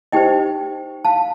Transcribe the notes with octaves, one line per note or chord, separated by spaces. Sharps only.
D#4 G4 C5 D#5 G5
F5 A5